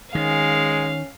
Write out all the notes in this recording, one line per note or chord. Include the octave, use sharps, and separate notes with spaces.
D#3 G#3 C#4 F5